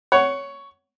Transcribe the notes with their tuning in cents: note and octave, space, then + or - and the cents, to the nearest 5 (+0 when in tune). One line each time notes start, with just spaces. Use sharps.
C#5 +10 F#5 +20